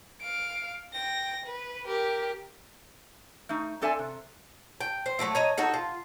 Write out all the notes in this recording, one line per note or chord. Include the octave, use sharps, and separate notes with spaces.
F5 D7
G5 A#6
B4
G4 A#4
A3 D#4
C4 D4 A4 D5 E5 G#5
C3
G5
C5
F#3 A3 C4 E4
C#5 D#5 A#5
D#4 F#4 A4 C#5
F4